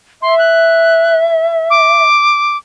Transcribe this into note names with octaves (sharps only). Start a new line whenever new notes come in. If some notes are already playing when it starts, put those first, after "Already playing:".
E5 C6
F#6
D6